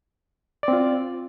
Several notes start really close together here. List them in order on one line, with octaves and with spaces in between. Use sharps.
D5 C4 F4